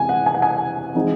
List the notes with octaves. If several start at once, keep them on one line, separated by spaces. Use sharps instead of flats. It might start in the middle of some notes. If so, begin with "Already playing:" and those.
Already playing: C3 E3 G#3 G#5
F#5
G#5
F#5
G#5
E3 G#3 C4 D#4